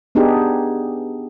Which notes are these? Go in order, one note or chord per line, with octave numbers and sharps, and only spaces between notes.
B3 D4 D#4 G4 G#4